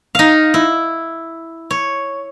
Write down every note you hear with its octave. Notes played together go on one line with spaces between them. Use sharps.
D#4 F5
E4
C#5